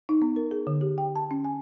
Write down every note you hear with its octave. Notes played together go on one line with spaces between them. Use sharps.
D#4
B3
A#4
G#4
D3
G4
G5
A5
C#4
G#5